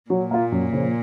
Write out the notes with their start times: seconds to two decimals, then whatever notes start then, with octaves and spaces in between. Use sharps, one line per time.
0.10 A#2 F#3
0.31 A#3 F4
0.52 F#2
0.72 C#3 F3